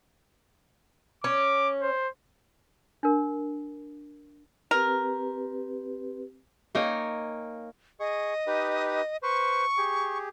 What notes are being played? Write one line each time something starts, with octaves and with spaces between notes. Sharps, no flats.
C#4 D6
C5
D4 A#4
C4 G4 A#4 B4
A#3 D#4 C#5 G5 G#5
G#4 D#5 C#6
D#4 G4 B4
B4 C5 C#6
G4 G#4